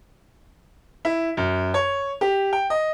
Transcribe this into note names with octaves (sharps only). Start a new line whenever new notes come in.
E4
F#2
C#5
G4
G5
D#5